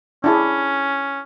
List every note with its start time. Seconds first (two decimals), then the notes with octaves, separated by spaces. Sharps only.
0.24 C#4 D4 E4 G#4